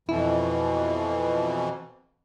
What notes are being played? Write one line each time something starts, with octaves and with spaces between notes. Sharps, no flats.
F2 B2 E3 E4